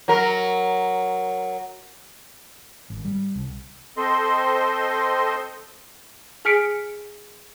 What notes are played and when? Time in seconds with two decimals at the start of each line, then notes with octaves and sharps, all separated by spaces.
0.08 F#3 A#4
2.90 G#1
3.05 G3
3.35 C2
3.97 C4 A4 C5 D#5 C6
6.45 G#4 G#5 F6 B6 C#7 D7